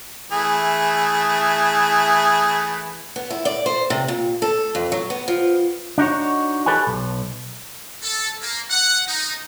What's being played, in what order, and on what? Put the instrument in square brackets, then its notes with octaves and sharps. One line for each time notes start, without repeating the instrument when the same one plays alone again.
[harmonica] E3 A3 G#4
[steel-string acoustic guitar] B3
E4
D5
C5
C3
A#2
A4
F2
F#3
B3
F3
[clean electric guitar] D4 D#4 F#4 C#5
G4 A4 B4 C#5 G#5
B1
[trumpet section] A4
A#3
F#5
D#4